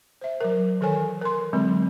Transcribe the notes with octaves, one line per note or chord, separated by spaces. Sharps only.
C5 E5
F#3 A#4
D#3 E3 A4 A#4 C#5 G#5
A#4 C6
D3 F#3 G#3 C4